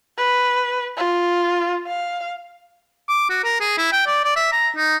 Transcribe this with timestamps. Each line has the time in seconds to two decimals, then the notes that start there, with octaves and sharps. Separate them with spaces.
0.18 B4
0.97 F4
1.87 F5
3.08 D6
3.30 F#4
3.44 A#4
3.60 G#4
3.78 E4
3.92 G5
4.07 D5
4.24 D5
4.36 E5
4.52 A#5
4.76 D#4